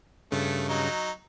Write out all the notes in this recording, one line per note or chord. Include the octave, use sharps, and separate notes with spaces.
G2 C#3 A3
F#3 D#4